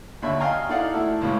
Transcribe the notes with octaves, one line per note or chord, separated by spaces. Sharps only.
D#2 D3 C#5 E5 B5
D#5 F5 G5 G#5 A#5
D#4 E4 A4 D5 F5 F#5
A3 E4 A4
C#2 A2 G#3 C#4